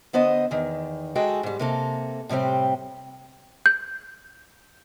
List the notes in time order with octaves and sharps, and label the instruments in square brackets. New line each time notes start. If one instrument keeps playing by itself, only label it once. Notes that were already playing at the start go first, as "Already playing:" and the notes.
[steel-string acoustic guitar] D3 B3 C5 D#5
E2 D#3
G#3 F#4 G#4 A4 G5
G#2 G3
C3 A#3 A4
A2 C3 G3 C4 G4
[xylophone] G6